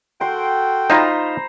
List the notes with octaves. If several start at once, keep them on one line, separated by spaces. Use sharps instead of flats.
F#4 A4 G5 C6
D#4 F4 C5 A#5 B5